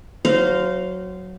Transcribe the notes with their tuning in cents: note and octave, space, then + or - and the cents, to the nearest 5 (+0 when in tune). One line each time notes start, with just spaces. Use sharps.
F#3 +0 C5 -25 F5 +0